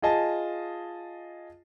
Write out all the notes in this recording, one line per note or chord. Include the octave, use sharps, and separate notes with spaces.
F4 G#4 D#5 A5